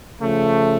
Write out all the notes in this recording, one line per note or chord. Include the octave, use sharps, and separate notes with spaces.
C#3 F3 A3